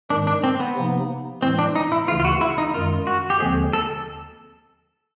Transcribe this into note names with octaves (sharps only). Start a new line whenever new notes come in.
G#2 D#3 G#3 D4
D4
C4
B3
C3 F3 A#3 D#4
A2 E3 G#3 C4
D4
D#4
E4
D2 C#3 E3 F4
F4
F#4
E4
D#4
F#2 D#3 G#3 F4
F#4
G4
D#2 D3 F3 G#3 C4 G#4
A4